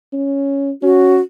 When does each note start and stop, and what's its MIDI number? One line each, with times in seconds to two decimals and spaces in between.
0.13 0.71 61
0.82 1.19 61
0.82 1.21 66